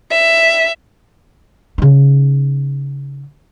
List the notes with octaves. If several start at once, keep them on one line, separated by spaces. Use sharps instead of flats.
E5
C#3 D#4